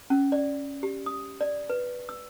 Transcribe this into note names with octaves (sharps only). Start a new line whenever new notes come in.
C#4
D5
G4
D#6
D5
B4
E6